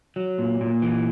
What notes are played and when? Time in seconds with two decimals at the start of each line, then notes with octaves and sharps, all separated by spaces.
0.16 F#3
0.38 A#2
0.61 A#2
0.82 E3